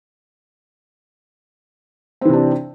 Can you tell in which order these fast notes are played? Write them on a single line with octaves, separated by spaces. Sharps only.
C4 E3 C3 D4